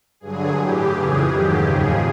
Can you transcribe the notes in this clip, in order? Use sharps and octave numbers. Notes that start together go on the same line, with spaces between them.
G2 D3 F#3 G#4
A2 E3 G4
F2 C#3 E3 G#4
G#2 D#3 F#3 G4
D#2 C#3 F3 G#4